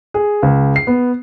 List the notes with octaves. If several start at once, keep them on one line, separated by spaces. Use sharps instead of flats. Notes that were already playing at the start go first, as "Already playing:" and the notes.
G#4
C#2
C7
B3